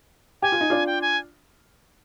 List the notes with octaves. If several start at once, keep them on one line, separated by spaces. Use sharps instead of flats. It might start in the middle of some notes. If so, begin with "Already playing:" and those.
G4 G#5
F4
D#4
D4 F4
G5
G#5